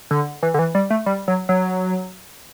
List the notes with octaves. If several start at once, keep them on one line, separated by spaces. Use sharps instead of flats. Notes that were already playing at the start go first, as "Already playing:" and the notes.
D3
E3
D3
E3
G3
A3
G3
F#3
F#3